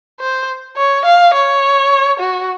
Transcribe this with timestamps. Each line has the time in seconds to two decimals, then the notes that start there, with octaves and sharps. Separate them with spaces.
0.20 C5
0.77 C#5
1.05 F5
1.34 C#5
2.19 F#4